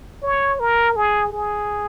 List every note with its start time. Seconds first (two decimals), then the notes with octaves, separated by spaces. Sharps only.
0.23 C#5
0.60 A#4
0.96 G#4
1.33 G#4